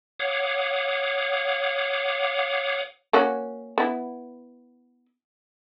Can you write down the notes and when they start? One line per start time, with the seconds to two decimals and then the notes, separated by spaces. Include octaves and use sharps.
0.20 C#5 F5 F#5 D6 D#6
3.13 A#3 C#4 F#4
3.78 B3 E4